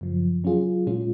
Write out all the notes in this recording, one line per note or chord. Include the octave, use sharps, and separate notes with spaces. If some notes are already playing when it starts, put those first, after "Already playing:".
F#2 C#3 F3
F#3 C#4 F4 G#4
A#2 G#3 C#4 F4